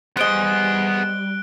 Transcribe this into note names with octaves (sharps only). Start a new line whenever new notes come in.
G3 B3 G#4 C5 D#5 F#6 D7 G7